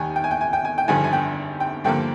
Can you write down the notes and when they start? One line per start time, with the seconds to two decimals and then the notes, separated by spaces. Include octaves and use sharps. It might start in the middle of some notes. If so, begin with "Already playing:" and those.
Already playing: D#2 D#3 G3 G#5
0.16 G5
0.24 G#5
0.31 G5
0.41 G#5
0.53 G5
0.65 G#5
0.78 G5
0.88 G#1 G2 D3 F3 G#5
1.04 G#5
1.13 G5
1.60 G5
1.84 G2 D3 F3 A#3 G5